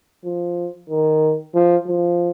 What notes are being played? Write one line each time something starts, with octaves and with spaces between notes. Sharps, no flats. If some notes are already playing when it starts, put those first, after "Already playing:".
F3
D#3
F3
F3